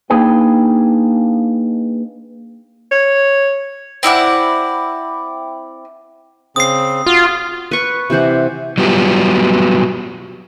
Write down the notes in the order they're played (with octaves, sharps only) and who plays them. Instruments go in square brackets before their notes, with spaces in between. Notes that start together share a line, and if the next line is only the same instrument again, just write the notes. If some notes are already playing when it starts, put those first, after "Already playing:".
[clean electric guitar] A#3 D4 D#4 G#4 B4 G5
[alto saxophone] C#5
[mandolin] C4 E4 D5 F#5
[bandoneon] C#3 C4 [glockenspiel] D#6 C7
[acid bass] F4 [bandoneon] F#4
[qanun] B4 C#6
C3 E3 C5 F#5
[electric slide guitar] F#3 G3 B3 F4 G4